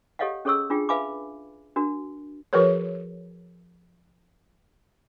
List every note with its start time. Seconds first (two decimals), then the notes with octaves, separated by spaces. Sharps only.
0.19 G4 A4 C#5 D#5 F5 F#5
0.45 C#4 G#4 A4 C#5 C#6 E6
0.70 D4 F4 G#4 G5
0.89 B4 E5 F5 G#5 B5 D6
1.76 D4 F#4 A#4
2.53 F3 F#4 G#4 A#4 B4 C#5